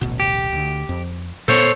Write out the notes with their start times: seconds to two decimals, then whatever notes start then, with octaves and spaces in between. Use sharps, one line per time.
0.01 D1 A1 B2
0.20 G4
0.53 D2
0.89 F2
1.48 A#2 A3 B3 A4 C5 C#5